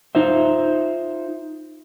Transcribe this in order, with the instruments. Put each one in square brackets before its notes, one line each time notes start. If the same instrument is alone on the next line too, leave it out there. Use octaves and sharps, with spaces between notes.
[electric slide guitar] D#4 F4 C5 E5